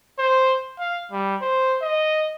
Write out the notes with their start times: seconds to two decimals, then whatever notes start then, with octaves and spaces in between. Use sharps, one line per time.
0.19 C5
0.79 F5
1.12 G3
1.42 C5
1.82 D#5